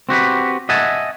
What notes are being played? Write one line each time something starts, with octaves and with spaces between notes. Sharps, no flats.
C4 F#4 G4 B4
D#5 E5 F#5 G#5 A5